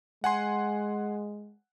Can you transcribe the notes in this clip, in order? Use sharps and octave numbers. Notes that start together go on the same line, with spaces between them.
G#3 F#5 G#5 C6